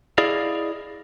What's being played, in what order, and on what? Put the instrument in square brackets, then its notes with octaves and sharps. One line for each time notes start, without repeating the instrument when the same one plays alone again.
[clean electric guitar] E4 G#4 D5 D#5 F5